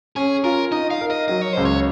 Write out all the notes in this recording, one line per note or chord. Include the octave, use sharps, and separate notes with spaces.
C#4 G#4
F4 A#4
D#4 D#5
F5
A#4
D#5
F#3 D#5
C#5
C#2 C5
C#5